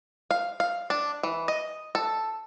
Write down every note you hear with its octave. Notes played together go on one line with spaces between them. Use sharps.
F5
F5
D4
E3
D#5
A4